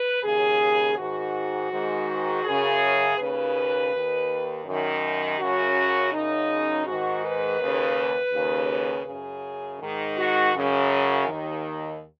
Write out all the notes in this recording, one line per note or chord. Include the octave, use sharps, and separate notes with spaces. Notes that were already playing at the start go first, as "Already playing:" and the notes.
Already playing: B4
D#2 C#3 G#4
G#2 D#3 F#4
G#2 D#3
F#2 C#3 G#4
D#2 C#3 B4
D#2 D#3
F#2 D#3
F#2 C#3 F#4
F#2 C#3 D#4
G#2 D#3 F#4
B4
D#2 C#3
D#2 C#3
F#2 C#3 G#4
G#2 D#3
F#4
F#2 C#3
D#2 D#3